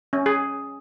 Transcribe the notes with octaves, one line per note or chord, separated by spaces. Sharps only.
C#4
G#4